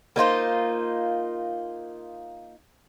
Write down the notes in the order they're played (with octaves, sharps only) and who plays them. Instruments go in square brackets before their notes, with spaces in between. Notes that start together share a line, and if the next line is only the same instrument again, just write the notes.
[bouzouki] A#3 D#4 F4 C5